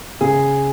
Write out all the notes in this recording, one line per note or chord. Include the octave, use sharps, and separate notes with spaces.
C#3 G#4